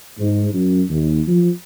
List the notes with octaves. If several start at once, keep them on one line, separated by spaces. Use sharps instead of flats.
G#2
F#2
D#2
F3